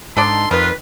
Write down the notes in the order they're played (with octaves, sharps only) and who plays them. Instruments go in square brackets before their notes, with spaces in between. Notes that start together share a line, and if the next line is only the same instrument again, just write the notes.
[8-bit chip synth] G#2 [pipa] D4 D#4 A4 [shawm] C6
[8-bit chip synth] F2 [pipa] D#3 [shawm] F4 [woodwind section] B4